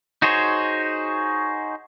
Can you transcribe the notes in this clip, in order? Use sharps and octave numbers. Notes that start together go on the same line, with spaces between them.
D#4 F#4 G#4 C5 C#5